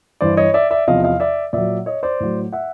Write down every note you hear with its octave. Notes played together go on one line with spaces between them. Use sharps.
G2 E3 C5 D5
C#5 D#5
D5 E5
D5 E5
E2 C3 F3 D#5 F5
D#5 F5
D5 E5
A#2 F#3 D5 E5
C#5 D#5
C5 D5
A2 F#3
E5 F#5